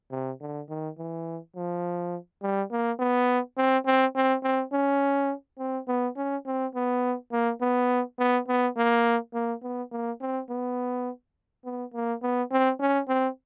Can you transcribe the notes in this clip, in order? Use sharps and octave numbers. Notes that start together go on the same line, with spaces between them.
C3
D3
D#3
E3
F3
G3
A#3
B3
C4
C4
C4
C4
C#4
C4
B3
C#4
C4
B3
A#3
B3
B3
B3
A#3
A#3
B3
A#3
C4
B3
B3
A#3
B3
C4
C#4
C4